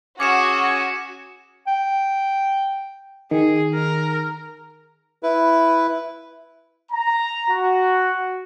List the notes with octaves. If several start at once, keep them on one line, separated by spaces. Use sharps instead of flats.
C#4 F#4 G#4 D6 C#7 E7
G5
D#3 G#4
A#4
E4 B4
A#5
F#4